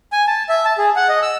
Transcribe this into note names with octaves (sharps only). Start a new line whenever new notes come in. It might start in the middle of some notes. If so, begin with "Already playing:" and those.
G#5
A5
E5
A5
G#4
F#5
D#5
E6